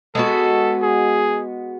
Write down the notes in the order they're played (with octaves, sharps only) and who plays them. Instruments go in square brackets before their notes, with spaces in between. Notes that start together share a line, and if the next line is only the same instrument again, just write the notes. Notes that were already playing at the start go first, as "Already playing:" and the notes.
[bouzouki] G#3 B3 F#4 [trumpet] A4
[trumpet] G#4